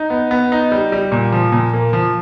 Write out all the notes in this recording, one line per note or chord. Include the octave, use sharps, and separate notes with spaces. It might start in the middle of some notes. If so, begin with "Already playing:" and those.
Already playing: D#4
B3
B3
D#4
G3
G3
A#2
F3
A#2
A#3
F3